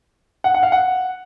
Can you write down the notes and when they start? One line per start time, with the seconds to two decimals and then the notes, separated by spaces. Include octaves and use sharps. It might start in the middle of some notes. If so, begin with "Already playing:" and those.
0.44 F#5
0.54 F#5
0.63 F5
0.72 F#5